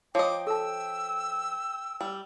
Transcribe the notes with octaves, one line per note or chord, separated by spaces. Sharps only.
F3 C#5 D#5 G5 D6
A4 A5 E6
G3